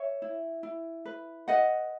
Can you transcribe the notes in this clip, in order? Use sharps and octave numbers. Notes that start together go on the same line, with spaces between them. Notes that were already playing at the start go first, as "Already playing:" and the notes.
Already playing: C#5 E5
E4
E4
B4
B4 D#5 F#5